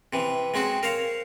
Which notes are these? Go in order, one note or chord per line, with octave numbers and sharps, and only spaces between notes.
C3 E3
F#3 G#3 C4 F#4
A#4 C5 C#5 F5